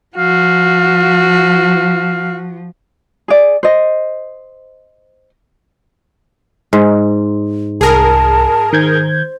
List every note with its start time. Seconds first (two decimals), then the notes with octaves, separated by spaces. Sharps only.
0.17 F3 F#4 F5
3.28 G#4 D5
3.63 C5 D#5
6.73 G#2
7.81 C2 G#4 A#4 A5
8.73 D#3 C5 G6 G#6